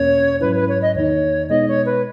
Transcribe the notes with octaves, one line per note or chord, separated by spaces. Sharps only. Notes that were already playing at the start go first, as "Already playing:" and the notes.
Already playing: E2 B2 A#3 C#4 C#5
G#2 F#3 C#4 E4 B4
B4
C#5
D#5
E2 D#3 A#3 D#4 C#5
B2 G#3 B3 D#4 D#5
C#5
B4